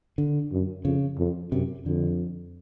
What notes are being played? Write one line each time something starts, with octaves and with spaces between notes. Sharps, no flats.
D3
F#2
F2 C#3
F2
F#2 C3
F2 D3